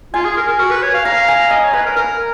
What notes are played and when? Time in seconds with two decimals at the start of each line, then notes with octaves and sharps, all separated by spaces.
0.14 F4 G#5
0.25 G#4
0.37 A#4
0.48 A#4
0.59 F#4
0.71 B4
0.83 C#5
0.94 F5
1.05 F5 A#5
1.28 G#5
1.50 D#5 A#5
1.63 C#5
1.73 B4 B5
1.86 A#4
1.96 A#4 A#5